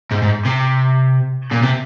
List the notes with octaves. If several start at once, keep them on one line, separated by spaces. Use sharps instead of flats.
G#2
G#2
C3
A#2
C3